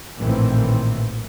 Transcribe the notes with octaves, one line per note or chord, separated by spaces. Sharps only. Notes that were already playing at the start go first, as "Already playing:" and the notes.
A#1 A2 D#3 E3 C4